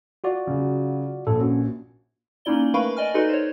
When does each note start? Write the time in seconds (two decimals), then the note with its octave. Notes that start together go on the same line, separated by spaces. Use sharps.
0.24 F4 F#4 D5
0.47 C#3 F#3
1.27 A#1 A4
1.40 C#4 F#4
2.45 A#3 C#4 D#4 E4 D5 G7
2.74 A3 A#4 B4 F5 B5 C#6
2.97 D5 D#5 G#5 F6
3.14 D#4 F#4 A4 B4 D5 C6
3.29 C5 C#5